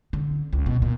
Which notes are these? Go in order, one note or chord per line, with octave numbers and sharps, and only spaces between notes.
D3
C#2
B2
A#2